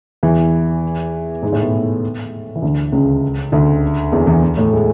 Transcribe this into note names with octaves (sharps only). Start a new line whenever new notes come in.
E2 E3
G#2 G#3
A2 A3
B2 B3
E3
D2 D3
C#2 C#3
D2 D3
E2 E3
E2 E3
A2 A3
G#3